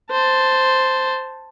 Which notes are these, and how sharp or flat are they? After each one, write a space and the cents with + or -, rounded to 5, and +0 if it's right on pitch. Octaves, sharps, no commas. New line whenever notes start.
C5 +0 A5 +5